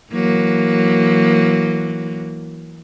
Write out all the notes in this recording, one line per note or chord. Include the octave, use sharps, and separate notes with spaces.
E3 F#3 A#3